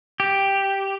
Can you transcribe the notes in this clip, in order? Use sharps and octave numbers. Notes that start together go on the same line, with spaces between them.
G4